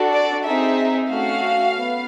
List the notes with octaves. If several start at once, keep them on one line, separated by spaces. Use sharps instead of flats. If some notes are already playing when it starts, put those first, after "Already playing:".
Already playing: D4 F#4 A4
D5
C4 D#4 G#4 E5
A3 C#4 F#4 F5
B3